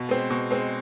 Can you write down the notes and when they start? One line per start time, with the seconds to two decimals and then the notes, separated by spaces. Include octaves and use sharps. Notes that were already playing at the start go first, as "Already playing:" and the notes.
Already playing: B2
0.09 G#3 C4
0.30 B2
0.51 G#3 C4